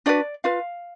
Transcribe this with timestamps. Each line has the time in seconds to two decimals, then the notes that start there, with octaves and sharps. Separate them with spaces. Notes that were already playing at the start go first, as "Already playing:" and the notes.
0.06 D4 F#4 B4 D5
0.44 F4 B4 F5